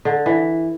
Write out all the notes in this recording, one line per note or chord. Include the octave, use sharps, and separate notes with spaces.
D3
E3